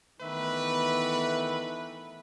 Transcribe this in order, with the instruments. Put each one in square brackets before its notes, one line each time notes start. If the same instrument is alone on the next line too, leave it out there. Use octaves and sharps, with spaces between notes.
[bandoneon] D#3 E5 [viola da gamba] E3 A3 B3 [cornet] B4